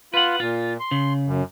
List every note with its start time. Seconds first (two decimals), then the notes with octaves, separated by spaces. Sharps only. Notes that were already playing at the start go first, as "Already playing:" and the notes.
0.14 F4 B4 F#5
0.40 A#2 F4
0.80 C6
0.91 C#3
1.26 F#2